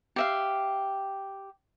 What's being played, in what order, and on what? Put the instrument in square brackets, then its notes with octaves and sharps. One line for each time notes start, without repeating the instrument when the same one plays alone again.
[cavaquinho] G4 E5 F5